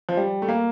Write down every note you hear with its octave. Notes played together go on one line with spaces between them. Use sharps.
F3
G3
A3
A#3